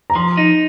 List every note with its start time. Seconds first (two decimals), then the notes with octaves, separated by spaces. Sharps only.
0.10 A#5
0.15 F3 C6
0.37 D#4